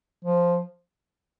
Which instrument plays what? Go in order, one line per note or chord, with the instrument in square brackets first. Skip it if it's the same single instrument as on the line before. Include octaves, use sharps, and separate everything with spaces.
[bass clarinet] F3